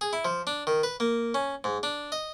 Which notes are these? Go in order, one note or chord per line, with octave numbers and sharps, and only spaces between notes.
G#4
E4
F3
D4
D#3
B4
A#3
C#4
G#2
D4
D#5